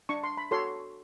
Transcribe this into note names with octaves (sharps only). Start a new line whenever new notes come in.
D4 C#6
C6
B5
F#4 A4 C#5 C6